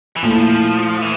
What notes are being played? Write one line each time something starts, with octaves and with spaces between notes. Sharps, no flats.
E3
A#2 F3 A3 E4
E3